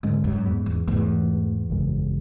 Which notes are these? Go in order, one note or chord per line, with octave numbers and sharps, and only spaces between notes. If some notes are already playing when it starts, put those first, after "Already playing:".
G#2 D3 G#3 C#4
F#2
E2
E2
E2 G#2 E3 A3
G#1 F#2 C#3 G#3